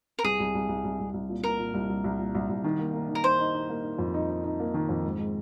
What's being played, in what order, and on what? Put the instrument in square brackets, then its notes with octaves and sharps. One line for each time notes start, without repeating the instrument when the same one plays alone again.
[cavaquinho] A#4
[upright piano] C2 [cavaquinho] G#4
[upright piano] C2
C2
C2
C2
C2
C2
A#2
[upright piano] A#2 [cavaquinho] A#4
[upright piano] A#2
C2
C2
C2
A#2
C2
C2
D#3
A#3
A#3
D#3
[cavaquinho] A#4
[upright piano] D#4 [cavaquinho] C5
[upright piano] D#4
D#4
A#3
D#4
F2
D#4
D#4
D#4
A#3
D#3
F2
G#2
G#3